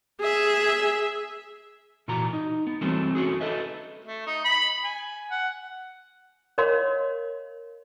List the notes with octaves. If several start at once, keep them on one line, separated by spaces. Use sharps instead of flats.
G#4 E5
A#2 E3 F#4 A#5
D#4
B3
E3 F#3 G3 A3 C4
A3 C#4 F#4 G#4
A4 B4 D#5 E5
A3
D#4
B5
G#5
F#5
A#4 C#5 D#5 F5 C6